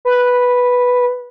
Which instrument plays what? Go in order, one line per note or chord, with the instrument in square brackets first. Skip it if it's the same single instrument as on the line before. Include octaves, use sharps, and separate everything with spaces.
[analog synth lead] B4